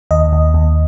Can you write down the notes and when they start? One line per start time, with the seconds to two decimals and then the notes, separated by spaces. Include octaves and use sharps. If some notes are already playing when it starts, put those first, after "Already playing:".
0.11 D#2 D#5
0.33 D#2
0.54 D#2